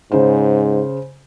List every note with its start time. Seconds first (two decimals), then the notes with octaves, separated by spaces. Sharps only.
0.12 G#2 C#3 C5